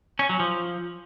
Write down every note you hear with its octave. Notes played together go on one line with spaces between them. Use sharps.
C#4
F#3
F3